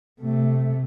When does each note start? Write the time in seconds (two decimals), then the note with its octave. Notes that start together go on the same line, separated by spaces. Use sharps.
0.20 C3 A3